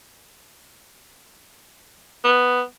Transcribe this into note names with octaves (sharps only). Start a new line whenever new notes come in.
B3